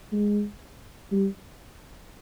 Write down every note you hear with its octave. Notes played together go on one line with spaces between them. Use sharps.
G#3
G3